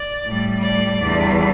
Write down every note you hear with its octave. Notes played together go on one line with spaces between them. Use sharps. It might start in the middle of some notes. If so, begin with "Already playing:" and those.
Already playing: D5
A2 G3
D5
E2 D3 G3